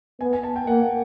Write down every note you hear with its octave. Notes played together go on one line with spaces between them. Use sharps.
B3 G#5
G#5
A5
G5
A#3 F#5